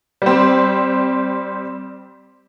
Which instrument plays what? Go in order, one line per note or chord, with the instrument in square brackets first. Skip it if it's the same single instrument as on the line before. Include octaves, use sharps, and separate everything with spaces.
[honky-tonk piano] G3 C4